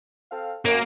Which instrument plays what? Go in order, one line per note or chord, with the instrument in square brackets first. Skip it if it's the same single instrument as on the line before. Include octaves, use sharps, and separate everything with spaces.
[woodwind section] C4 A4 F5
[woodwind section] F#2 [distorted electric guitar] A#3